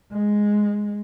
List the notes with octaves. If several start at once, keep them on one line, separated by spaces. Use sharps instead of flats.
G#3